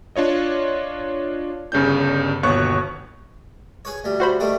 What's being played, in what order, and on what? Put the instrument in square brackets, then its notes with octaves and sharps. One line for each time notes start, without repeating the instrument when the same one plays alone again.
[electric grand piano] D4 F4 C#5 D#5
G1 G2 C#3 C#4 D4 G6
G1 D#2 B2 C#5 C#6 F#6
[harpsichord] G#4 B4 C#5
D2 G3
[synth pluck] F#4 C5 B5
[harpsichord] D#3 G3 A3